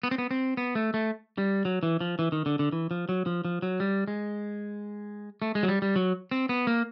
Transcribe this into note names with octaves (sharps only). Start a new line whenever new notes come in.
B3
C4
B3
C4
B3
A3
A3
G3
F#3
E3
F3
E3
D#3
D3
D3
E3
F3
F#3
F3
F3
F#3
G3
G#3
A3
G#3
F#3
G3
G3
F#3
C4
B3
A#3